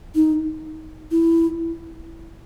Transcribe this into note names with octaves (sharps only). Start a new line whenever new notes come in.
D#4
E4